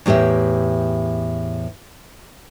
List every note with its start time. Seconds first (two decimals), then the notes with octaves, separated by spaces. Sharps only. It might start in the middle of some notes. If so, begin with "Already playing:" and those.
0.06 E2 A2 G4 A#4 E5